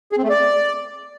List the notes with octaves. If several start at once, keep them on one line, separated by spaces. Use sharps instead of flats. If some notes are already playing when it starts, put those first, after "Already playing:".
G#4
C4
A3
D5